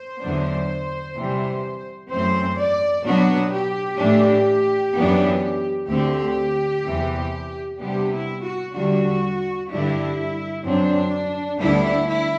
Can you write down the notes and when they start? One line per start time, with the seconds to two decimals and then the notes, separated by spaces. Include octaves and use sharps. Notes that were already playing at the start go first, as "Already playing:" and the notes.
Already playing: C5
0.20 E2 D3 F#3 B3 D4
1.15 C3 E3 G3
2.10 F#2 E3 A3 C4 C5
2.57 D5
3.05 B2 F#3 B3 D4 F#4
3.52 G4
4.00 A2 E3 A3 D4
4.95 F#2 E3 B3 D4
5.90 D2 D3 A3 C4 G4
6.85 E2 C3 E3
7.80 C3 G3 B3 D4 G4
8.12 E4
8.43 F#4
8.75 E2 D3 G3 D4 F#4
9.70 G2 D3 G3 D4 E4
10.65 F#2 F#3 C4 D4
11.59 D2 D3 G3 B3 D4 E4
12.07 E4